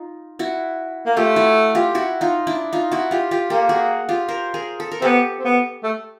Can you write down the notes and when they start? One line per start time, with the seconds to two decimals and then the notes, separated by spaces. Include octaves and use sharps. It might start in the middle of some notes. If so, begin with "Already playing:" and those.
Already playing: D#4 F4
0.39 E4 F#4
1.06 A#3
1.17 A3 F4 G4
1.36 E4 F#4
1.75 F4 G4
1.95 E4 F#4
2.21 D#4 F4
2.47 D4 E4
2.73 D#4 F4
2.92 E4 F#4
3.11 F4 G4
3.31 F4 G4
3.50 A#3 G4 A4
3.69 F#4 G#4
4.09 F4 G4
4.28 A#4 C5
4.54 G#4 A#4
4.80 A4
4.92 A#4
5.01 B3 C4 G4 A4
5.39 C4
5.45 B3
5.83 A3